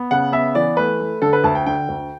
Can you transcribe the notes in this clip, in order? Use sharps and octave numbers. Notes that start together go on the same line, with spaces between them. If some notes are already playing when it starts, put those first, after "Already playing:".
Already playing: B3
C#3 F#5
B3 E5
E3 D5
A3 B4
A3
D3 A4
B4
D2 A5
G5
D3 G5
D2